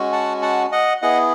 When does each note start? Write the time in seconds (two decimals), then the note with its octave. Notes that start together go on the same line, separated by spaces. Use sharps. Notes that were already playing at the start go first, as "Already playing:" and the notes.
Already playing: G#3 C#4 F#4
0.12 F#5 A5
0.42 F#5 A5
0.72 D#5 F#5
1.02 B3 E4 G#4 D#5 F#5